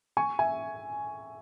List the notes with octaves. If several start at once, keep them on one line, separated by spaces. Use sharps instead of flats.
G#5 C#6
E5 G#5